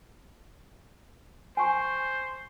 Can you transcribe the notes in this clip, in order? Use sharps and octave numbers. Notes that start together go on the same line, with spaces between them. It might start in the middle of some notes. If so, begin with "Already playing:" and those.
C5 G#5 C#6